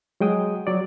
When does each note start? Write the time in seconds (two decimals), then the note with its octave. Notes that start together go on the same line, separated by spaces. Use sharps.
0.20 F#3 G#3 G5 D#6
0.67 F#3 D5